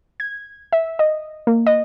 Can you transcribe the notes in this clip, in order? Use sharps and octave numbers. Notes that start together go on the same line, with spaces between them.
G#6
E5
D#5
A#3
D#5